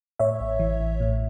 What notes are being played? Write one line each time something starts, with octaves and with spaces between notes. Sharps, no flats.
A2 C#5 E5
A1
E3
A1
A2